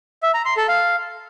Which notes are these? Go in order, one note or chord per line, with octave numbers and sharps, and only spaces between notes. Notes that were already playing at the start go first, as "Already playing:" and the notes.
E5
A#5
C6
A4
F5